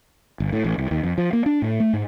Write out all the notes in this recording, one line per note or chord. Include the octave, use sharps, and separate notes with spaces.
G1
A2
A1
C2
D#2
F2
F3
A#3
D4
A2
A3
G#2